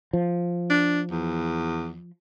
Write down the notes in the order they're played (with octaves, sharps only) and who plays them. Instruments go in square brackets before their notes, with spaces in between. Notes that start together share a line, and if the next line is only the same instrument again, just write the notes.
[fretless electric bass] F3
[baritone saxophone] D4
E2